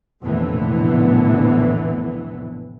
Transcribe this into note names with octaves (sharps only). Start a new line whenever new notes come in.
F1 A#1 A2 D3 E3 B3